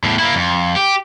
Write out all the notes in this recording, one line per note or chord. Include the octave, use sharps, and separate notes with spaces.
E2 A2
A#3 E4
F2
G4